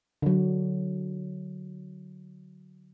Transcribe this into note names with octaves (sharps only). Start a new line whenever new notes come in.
D3 F#3